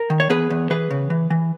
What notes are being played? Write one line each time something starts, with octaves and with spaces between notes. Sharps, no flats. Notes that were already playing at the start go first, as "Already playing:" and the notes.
Already playing: A#4
D#3
C#5
E2 G#4 B4
E2
E3 G#4 B4
C#3
E3
E3